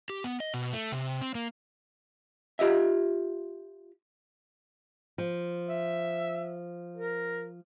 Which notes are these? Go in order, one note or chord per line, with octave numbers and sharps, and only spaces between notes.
G4
B3
D#5
B2
A3
C3
C4
A#3
F4 G4 D#5 E5
F3
E5
A#4